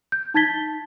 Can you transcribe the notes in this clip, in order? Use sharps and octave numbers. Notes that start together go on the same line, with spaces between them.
G6
D#4 A5 G#6 A6 B6 G7